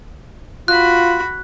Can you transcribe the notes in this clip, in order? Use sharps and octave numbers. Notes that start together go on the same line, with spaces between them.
F4 F#4 B5 F#6